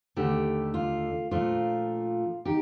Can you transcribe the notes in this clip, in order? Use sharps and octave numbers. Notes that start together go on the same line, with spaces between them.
D#2 D3 A3 G4
F4
A#2 F3 A3 D4 F4
D#4 G4